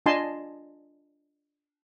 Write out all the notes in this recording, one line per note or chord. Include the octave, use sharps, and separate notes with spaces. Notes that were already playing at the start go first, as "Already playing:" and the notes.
D4 F4 D#5 G#5 A5 C6